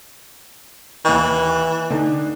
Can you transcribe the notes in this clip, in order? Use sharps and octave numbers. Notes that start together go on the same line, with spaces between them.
D#2 E3 D#5
D3 D4 D#4